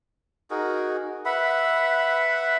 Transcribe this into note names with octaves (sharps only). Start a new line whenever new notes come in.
D#4 F#4 G#4 A#4
B4 E5 F#5 B5